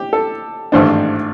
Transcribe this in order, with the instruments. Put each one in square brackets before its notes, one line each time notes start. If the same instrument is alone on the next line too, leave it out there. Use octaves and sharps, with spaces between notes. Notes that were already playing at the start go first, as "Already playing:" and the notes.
Already playing: [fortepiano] G4
A4
G#1 G2 E3 A3 D4 C5